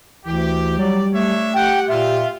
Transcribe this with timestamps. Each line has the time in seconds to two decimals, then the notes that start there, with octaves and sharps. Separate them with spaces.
0.25 D2 E3 G4
0.78 F#3 G3 D5
1.13 A3 D4 C#5 E5
1.54 G4 F#5 G5
1.88 A#2 F4 E5